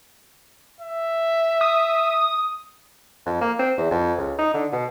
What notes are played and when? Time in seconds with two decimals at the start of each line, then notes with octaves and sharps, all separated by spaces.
0.80 E5
1.61 D#6
3.26 F2
3.41 A#3
3.59 C4
3.78 E2
3.91 F2
4.18 C#2
4.39 D#4
4.54 D3
4.73 B2